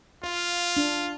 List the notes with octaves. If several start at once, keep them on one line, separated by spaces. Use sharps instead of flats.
F4 F5
D4